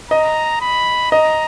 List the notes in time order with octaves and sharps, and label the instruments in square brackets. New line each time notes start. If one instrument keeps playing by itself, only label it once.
[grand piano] D#5 [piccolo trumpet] A#5
[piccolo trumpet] B5
[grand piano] D#5 [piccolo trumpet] A#5